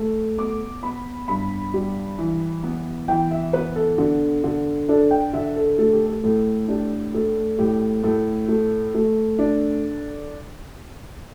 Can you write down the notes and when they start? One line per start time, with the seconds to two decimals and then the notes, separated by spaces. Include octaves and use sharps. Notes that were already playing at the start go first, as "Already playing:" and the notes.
Already playing: A3
0.38 B3 D6
0.83 B3 B5
1.28 G2 B5
1.74 G3
2.18 E3
2.63 B3
3.08 E3 G5
3.31 E5
3.53 B3 B4
3.76 A4
3.98 D3
4.44 D3
4.89 D4 A4
5.11 G5
5.33 D3 E5
5.56 A4
5.78 A3 A4
5.93 G4
6.06 A4
6.24 A2 A4
6.68 D4 G4
7.14 A3 A4
7.59 A2 G4
8.04 A2 A4
8.48 A3
8.94 A3
9.39 D4